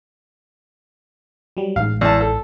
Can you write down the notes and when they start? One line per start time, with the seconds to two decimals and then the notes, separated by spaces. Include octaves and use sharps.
1.57 F#3 G3
1.76 A1 G#2 F5
2.01 E2 A5
2.21 A4